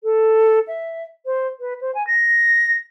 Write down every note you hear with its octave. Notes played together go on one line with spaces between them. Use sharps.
A4
E5
C5
B4
C5
G#5
A#6